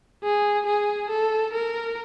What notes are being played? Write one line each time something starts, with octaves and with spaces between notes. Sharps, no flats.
G#4
G#4
A4
A#4